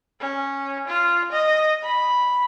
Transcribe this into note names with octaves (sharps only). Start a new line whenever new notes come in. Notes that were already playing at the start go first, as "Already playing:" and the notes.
C#4
F4
D#5
B5